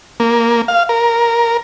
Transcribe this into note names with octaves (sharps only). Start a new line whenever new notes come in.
A#3
F5
A#4